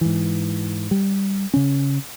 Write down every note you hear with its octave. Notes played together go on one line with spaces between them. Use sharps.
G#2 E3
G3
C#3 C#4